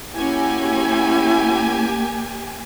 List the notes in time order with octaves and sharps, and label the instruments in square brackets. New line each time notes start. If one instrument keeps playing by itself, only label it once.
[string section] A#3 G4 G#5 [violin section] C#4 F#4 [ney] E4